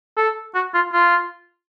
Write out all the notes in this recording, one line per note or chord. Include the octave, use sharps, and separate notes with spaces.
A4
F#4
F4
F4